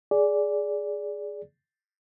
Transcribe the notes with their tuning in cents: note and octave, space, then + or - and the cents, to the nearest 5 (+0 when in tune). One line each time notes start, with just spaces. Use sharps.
G#4 +0 D5 -10